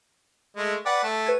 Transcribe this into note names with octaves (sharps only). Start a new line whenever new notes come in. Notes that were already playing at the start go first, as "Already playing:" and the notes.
G#3 A3
B4 D5 F#5 G5
A3 A4
B4 G#6